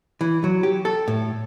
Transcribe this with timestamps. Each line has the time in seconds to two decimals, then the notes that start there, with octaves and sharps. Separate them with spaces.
0.21 E3
0.44 F#3
0.63 G4
0.85 A4
1.08 A2